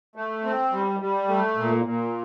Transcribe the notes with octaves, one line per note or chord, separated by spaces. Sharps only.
A3
C4
G3
G3
A3
A#2
A#2